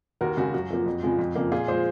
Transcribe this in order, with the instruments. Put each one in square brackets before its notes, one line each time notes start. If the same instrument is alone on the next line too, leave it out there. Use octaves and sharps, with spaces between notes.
[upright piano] D#2 F#4 A#4
C#3 G#3 F#4
F#2 F#4
F3 A#3
F2
C#3 F3 G#3
F2
C#3 F3 A#3
A#2 F4 G#4
F3 G#3 G#4 C5